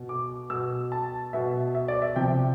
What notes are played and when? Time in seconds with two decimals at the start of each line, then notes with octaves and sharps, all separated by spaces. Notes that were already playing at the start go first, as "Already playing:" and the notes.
Already playing: B2
0.09 D6
0.50 B2 E6
0.92 A5
1.33 B2 E5
1.75 E5
1.88 D5
2.02 E5
2.16 C3 F3 G5